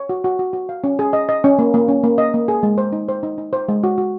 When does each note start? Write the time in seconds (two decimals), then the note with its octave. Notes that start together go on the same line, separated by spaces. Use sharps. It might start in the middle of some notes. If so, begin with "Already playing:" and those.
Already playing: C#5
0.09 F#4
0.24 F#4
0.39 F#4
0.53 F#4
0.69 F5
0.84 C#4
0.99 G#4
1.13 D#5
1.29 D#5
1.44 C#4
1.59 A#3
1.74 A#3
1.88 C#4
2.03 A#3
2.18 D#5
2.34 A#3
2.48 G#4
2.63 G#3
2.78 C5
2.93 D#4
3.09 C5
3.23 D#4
3.38 D#4
3.53 C5
3.68 G#3
3.84 F#4
3.98 F#4